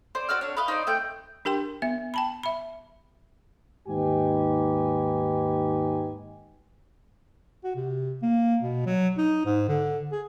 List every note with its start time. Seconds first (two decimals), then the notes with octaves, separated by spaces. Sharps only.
0.15 C5 D5
0.29 F#4 D5 E6 F6
0.41 D4 C#5
0.57 B4 D#5 F5
0.68 D#4 C5 D5
0.87 A3 G5 G6
1.45 D4 G4 A#4 G5 C6
1.82 B3 E5
2.14 G5 A5 B5
2.43 E5 B5
3.89 D#2 G#2 D#4 G4 B4 G#5
7.64 F#4
7.76 C3
8.22 A#3
8.62 B2
8.86 F#3
9.18 D#4
9.46 G#2
9.68 D3
10.12 G#4